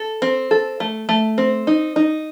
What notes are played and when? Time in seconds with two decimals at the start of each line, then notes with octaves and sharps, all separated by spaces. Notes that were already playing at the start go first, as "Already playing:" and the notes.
Already playing: A4
0.22 C4
0.51 A4
0.80 A3
1.09 A3
1.38 C4
1.67 D#4
1.96 D#4